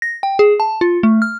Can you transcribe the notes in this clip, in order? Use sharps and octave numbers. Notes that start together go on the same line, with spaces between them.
A#6
G5
G#4
A5
F4
A3
F6